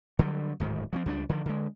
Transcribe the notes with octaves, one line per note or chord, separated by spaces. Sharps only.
D3 F#3 G3
D1 G#2 D#3
F3 G3 C4
C#2 G3 A#3 D4
D3 D#3 F3
D3 G#3